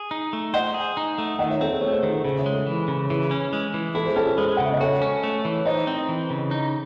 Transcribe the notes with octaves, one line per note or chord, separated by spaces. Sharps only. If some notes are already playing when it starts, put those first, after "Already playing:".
Already playing: G#4
D#4
A3
C5 D#5 F#5
G#4
D#4
A3
D#3 D#5 F#5
C#5 E5
C4 A4
G#4 C5
A3 A4 C#5
G#4 C5
D#3 A4
A4
C#3 G#4 C5
C#5 E5
G#3
A4
E3
C#3
E3 G#4
C#4
G#3
E3
E4 A4
G#4 C5
C#4 A4
A4
G#3 G#4 C5
F#5
C#3
E5
D#5
F#4 A4 C#5
C#4
A3
E3
D#4 C5 D#5
C4
E3
C#3
D#4